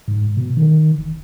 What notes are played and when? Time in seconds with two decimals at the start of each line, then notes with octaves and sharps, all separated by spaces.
0.08 G#2
0.37 B2
0.57 D#3
0.98 F1